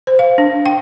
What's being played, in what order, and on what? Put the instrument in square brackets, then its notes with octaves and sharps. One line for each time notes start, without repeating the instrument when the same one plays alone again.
[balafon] C5
F5
D4
G5